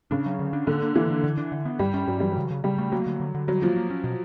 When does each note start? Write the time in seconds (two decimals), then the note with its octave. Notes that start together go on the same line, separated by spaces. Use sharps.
0.11 C#3 D4
0.26 F#3
0.39 D3
0.53 D4
0.67 D3 A#3
0.82 A#3
0.96 E3 A#3
1.10 A#3
1.24 D3
1.37 D4
1.52 D3
1.65 B3
1.79 G2 G3
1.94 C#4
2.07 G2 F#3
2.20 E3 G3
2.31 C#3 F#3
2.50 C#3
2.64 C#3 G3
2.78 A3
2.92 F#3 A#3
3.06 D3
3.20 D3
3.34 D3
3.48 F#3 G3
3.62 F3 A#3
3.77 A#3
3.90 C#4
4.04 B2